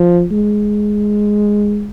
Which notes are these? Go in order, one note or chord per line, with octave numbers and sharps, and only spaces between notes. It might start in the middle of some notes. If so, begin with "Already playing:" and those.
Already playing: F3
G#3